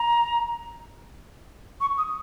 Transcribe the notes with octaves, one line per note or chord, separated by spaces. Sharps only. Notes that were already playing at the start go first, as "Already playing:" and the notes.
Already playing: A#5
C#6
D#6